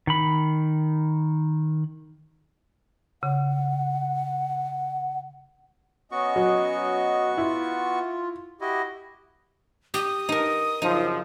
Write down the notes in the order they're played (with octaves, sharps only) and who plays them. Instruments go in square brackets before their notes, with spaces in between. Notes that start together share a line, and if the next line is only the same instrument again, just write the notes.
[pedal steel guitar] D#3 B5
[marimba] C#3 [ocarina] F#5
[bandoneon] B3 F#4 C#6 [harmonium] C#4 D#5
[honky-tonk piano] F#3
[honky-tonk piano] E4 [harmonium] F4
[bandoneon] E4 F#4 D#5 [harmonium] G4
[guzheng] G4 [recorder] D#6
[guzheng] D#4 A#4
[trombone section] F#2 C#3 F3 [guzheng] D#4